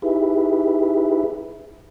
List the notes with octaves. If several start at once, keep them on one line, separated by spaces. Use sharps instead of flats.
D#4 E4 G4 G#4 B4 E5